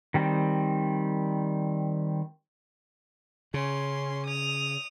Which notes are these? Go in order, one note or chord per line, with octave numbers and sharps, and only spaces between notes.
D#3 G3 C4
C#3 C#4 C6
D#6 F7